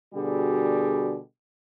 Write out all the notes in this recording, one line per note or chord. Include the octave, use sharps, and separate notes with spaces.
B2 D3 G3 F#4 G#4